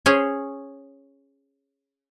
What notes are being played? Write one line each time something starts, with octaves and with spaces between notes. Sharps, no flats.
C#4 G#4 C5 C#5